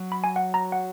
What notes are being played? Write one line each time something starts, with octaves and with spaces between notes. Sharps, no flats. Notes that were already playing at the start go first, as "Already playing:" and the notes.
Already playing: F#3
B5
G#5
F#5
A#5
F#5